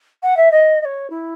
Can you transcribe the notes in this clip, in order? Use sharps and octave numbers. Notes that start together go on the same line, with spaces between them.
F#5
E5
D#5
D#5
C#5
E4